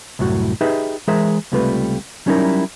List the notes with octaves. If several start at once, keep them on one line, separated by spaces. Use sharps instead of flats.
C2 F#2 A2 F#4
D#4 G4 G#4 B4 D#5 E5
E3 G#3 G#4 A#4 C5 E5
C#2 C3 G3 A3 F4 B4
F#3 G3 C#4 D#4 E4 A#4